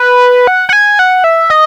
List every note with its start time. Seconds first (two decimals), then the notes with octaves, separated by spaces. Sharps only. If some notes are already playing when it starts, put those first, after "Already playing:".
Already playing: B4
0.47 F#5
0.69 F#5
0.73 G#5
0.99 F#5
1.24 E5
1.50 D#5